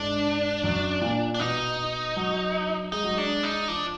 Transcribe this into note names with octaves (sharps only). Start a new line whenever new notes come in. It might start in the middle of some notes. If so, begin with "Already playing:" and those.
Already playing: G#2 D4
F#2
A#2
D4
B2 D#4
F#3
G#3 D#4
F#3
G#3 D4
D#4
F3 D4